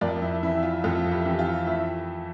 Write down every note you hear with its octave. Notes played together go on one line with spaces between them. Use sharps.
F2 A#4 D5
E4
E3 E4
F4
F2 F4 A4
E4 G4
E3
F4
A3 E4